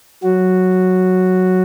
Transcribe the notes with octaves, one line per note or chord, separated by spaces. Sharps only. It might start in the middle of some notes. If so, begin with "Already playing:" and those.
F#3 F#4